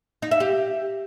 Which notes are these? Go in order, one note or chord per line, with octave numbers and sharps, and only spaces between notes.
D#4
E5
G4